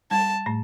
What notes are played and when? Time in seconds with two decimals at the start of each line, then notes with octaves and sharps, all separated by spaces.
0.11 G3 A5
0.46 A2 A3